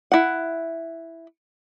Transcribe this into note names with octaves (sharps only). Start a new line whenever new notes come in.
E4 F#5